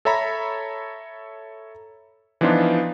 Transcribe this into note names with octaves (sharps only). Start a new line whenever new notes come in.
A4 C#5 E5 A#5 B5
E3 F3 B3 D4 D#4 F4